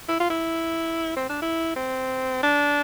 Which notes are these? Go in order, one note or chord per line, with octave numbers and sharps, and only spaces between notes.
E4
F4
E4
C4
D4
E4
C4
D4